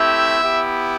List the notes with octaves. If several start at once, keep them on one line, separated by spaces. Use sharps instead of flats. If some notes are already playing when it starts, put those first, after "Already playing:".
Already playing: A3 C4 E4 G4 E5
B3 E4 G4